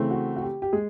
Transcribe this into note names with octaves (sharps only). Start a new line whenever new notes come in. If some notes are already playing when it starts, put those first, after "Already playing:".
Already playing: C#3 E3 A3 C4
F#4
F#4
G4
G4
G#3 G#4